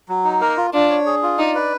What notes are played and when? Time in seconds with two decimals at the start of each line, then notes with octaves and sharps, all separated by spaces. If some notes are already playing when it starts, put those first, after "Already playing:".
0.09 F#3
0.24 D#4
0.41 A#3 A#4
0.57 F4
0.73 D4 F4
0.90 C#5
1.06 G#4
1.23 F4
1.38 D#4 D5
1.55 B4